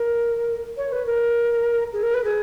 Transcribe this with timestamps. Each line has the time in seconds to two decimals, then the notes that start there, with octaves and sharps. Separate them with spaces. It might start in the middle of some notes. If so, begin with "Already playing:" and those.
Already playing: A#4
0.77 C#5
0.92 B4
1.06 A#4
1.93 G#4
2.03 A#4
2.14 B4
2.24 G#4